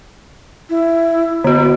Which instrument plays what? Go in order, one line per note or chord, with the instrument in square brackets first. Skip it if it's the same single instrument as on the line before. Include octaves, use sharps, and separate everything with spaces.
[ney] E4
[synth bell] D3 F#4 [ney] B3